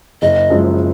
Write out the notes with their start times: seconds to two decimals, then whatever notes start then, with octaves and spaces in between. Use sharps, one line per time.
0.22 F#1 D#5
0.50 F#2 F3 G#3